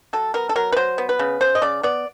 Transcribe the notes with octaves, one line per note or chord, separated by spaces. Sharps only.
F#3 A4
B3 A#4
A4
F#3 A#4
B4
F#3 C5
B3
B4
C#3
C#3 C5
D#5
C#3 D5
B3 D5